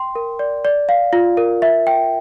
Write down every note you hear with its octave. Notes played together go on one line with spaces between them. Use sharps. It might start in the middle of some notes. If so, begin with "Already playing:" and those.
Already playing: G5 C6
A#4
D5
D5
F5
F4
A#4
E5
G5